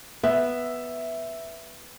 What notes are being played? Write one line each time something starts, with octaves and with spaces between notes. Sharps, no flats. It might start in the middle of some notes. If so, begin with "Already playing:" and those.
B3 E5